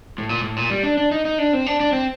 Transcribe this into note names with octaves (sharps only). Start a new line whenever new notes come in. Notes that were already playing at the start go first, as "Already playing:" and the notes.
A2
A#2
A2
A#2
G3
D4
D4
D#4
D#4
D4
C4
D4
D4
C4